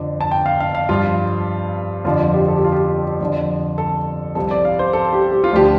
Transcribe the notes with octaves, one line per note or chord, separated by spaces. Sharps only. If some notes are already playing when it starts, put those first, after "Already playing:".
Already playing: F2 D3 F3
A5
G5
F5
F5
F5
G2 F3 F4
F2 D3 F3 F4
F4
G4
A4
G4
F4
G4
F2 D3 F3
A4
C2 C3 F3 A4
D5
F5
C5
A4
G4
G4
F4
D2 D3 F3 G4